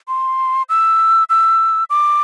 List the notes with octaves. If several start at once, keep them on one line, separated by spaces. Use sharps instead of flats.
C6
E6
E6
D6